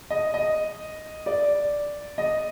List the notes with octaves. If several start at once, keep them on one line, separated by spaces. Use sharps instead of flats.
D#5
D#5
D5
D#5